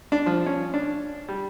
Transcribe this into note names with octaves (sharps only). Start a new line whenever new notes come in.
D4
F3
C#4
D4
G3